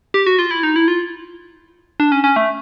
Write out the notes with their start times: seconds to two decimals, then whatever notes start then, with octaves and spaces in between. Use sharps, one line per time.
0.14 G4
0.26 F#4
0.39 F4
0.51 E4
0.63 D#4
0.76 E4
0.88 F4
2.00 D4
2.12 C#4
2.24 C#4
2.36 A3